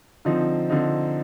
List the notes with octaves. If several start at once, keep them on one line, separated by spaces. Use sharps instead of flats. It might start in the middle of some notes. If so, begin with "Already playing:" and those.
D3 F3 C4 D#4
D3 F3 C4 D#4